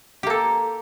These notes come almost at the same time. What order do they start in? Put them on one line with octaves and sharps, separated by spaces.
G4 A#3 A4